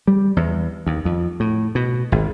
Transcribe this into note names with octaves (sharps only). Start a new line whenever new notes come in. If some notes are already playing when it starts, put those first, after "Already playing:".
G3
E2
D#2
F2
A2
B2
G#1